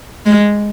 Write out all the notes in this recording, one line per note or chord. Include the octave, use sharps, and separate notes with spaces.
G#3